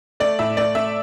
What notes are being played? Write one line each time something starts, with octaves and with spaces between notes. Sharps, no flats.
A3 D5
A2 E5
A3 D5
A3 E5